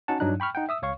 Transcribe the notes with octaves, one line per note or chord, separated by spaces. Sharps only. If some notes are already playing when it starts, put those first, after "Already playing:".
C#4 D#4 F#4 F#5 A5
G2 F#3 D4 D#4 F#6
G5 B5 C#6 F6
D#4 F#5 G5
E5 D#6 E6
C#2 C#5 F5 C#6